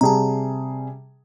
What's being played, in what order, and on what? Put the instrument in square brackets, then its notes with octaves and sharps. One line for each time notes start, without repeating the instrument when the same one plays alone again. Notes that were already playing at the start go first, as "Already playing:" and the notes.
[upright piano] C3 G3 G#4 [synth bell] A5 A#5